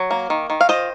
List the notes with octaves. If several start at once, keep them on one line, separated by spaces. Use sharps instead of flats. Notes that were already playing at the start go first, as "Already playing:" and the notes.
Already playing: F#3
A#3
D#3
D#3
F5
F4 C5 D#5